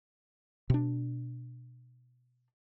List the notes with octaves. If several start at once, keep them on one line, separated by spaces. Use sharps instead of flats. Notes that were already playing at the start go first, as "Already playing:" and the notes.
B2 D4